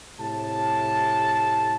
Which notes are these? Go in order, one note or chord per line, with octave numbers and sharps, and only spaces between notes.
A2 C3 A5